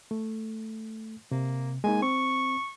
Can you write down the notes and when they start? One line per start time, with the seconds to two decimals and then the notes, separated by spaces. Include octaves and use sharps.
0.11 A3
1.31 C3 A#3
1.84 G#3 A#3 D#4 G#5
2.02 C4 C#6